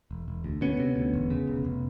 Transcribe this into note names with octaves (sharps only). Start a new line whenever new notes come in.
E1
E1
D2
D2 B3 C#4
C3
D2
E1
C#3
F1
F1